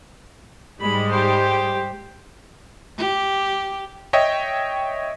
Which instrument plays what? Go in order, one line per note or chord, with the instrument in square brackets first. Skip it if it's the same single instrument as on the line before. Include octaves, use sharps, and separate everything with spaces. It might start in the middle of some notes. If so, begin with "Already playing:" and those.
[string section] G#2 G3 G#3 [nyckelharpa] B5
[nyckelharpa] G4 C5
[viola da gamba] G4
[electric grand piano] C#5 D#5 E5 G5